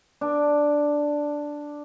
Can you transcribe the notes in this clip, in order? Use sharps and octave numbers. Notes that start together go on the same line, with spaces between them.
D4